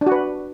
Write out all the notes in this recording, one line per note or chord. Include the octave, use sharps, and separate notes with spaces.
D4
F#4
B4